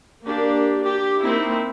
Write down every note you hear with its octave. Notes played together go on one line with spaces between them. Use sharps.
A#3 D4 G4
G4
A#3 C4 D#4 E4